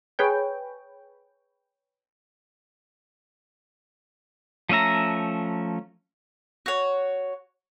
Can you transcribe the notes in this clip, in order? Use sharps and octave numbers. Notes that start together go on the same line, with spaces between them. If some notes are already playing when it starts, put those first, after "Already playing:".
G#4 B4 C#5 G5
F3 A3 C#4 E5 A#5
F#4 C#5